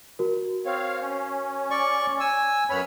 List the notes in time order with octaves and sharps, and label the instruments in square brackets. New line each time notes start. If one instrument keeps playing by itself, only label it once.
[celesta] F#4 A#4
[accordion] C4 C#5 F5
C#4
[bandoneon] D5 C#6
G#5 E6
[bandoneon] F#2 C#5 [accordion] B3 B5 F6